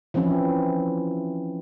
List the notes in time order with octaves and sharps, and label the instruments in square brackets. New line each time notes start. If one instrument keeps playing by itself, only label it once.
[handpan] E3 F3 C4 C#4 E4